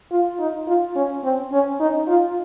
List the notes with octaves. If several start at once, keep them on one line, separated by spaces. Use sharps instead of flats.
F4
D#4
F4
C#4
C4
C#4
D#4
F4